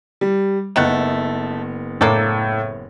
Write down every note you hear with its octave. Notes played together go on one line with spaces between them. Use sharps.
G3
F#1 D#3 A3 B3 F#5
A2 A#3 D4 A4